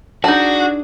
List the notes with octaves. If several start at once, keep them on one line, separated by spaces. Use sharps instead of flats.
D4 D#4 F#4 G#4 A5